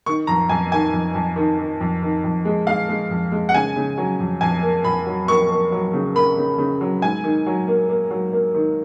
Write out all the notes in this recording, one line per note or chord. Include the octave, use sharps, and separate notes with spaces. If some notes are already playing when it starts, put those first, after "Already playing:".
D#3 C#6
F2 A#5
F2 G#5
D#3 G#5
F2
F2
D#3
D#3
F2
D#3
F2
G#3
G#3 F5
G#3
F2
G#3
F#5
C#3 G#5
C#3
F#3
F2
F2 G#5
A#3
F2 B5
F#3
A#3 C#6
A#3
F#3
C#3
A#3 B5
C#3
C#3
F#3
G#2 G#5
D#3
F#3
A#3
A#3
F#3
A#3
D#3